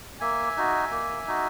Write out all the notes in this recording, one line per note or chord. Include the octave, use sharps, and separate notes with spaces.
A#3 E5 G#5
D#4 F#4
A#3
D#4 F#4